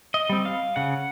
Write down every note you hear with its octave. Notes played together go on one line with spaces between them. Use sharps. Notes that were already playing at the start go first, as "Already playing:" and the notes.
D#5
G3 C4
F5
C#3 F#5